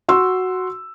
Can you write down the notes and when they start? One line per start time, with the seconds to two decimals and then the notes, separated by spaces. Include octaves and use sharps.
0.08 F#4 C6 E6